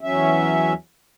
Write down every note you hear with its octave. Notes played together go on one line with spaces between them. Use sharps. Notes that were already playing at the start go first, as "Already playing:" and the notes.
E2 F#3 C#4 E5